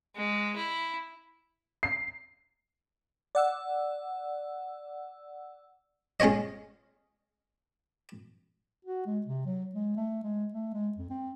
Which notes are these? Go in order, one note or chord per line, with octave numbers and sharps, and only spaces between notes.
G#3
E4
C7
D5 F#5 E6
G#3 C#4 F4 C#5 D#5
F#4
G#3
C3
F#3
G#3
A3
G#3
A3
G#3
F2
C4